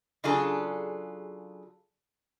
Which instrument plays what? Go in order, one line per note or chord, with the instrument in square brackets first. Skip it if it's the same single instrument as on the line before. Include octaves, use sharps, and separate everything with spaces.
[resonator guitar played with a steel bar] C#3 F#3 D4 F4 G#4 A4